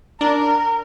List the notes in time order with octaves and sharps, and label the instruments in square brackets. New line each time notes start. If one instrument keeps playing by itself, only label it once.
[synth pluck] D4 [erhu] A#4